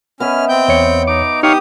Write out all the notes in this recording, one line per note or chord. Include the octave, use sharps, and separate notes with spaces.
B3 C#4 D#5 E5 F6
C4 G5 G6
E2 C#5 C#7
D#4 D6
D#4 G4 C#5 F5 D#6